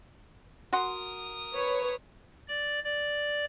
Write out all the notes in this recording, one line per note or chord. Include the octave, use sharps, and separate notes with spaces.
F#4 A#4 C6 D#6
B4 C#5
D5
D5